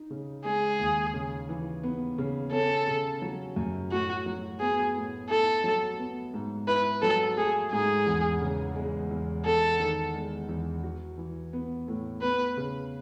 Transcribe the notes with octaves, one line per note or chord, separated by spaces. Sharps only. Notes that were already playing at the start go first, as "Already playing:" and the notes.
Already playing: D#4
C#3
G#3 G#4
D#2
C#3
E3
B3
C#3
C#4 A4
C#3
F#3
F#2
A2 F#4
F#3
B3 G#4
A2
E4 A4
F#3
B3
G#2
E4 B4
F#3 A4
A3 G#4
G#2 G#4
E2
C#3
G#3
E2
E2 A4
D#3
G#3
E2
F#4
E3
B3
A2
B3 B4
C#3